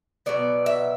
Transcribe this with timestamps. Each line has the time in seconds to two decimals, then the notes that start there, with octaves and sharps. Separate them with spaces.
0.26 B2 F#3 B3 D5
0.66 E5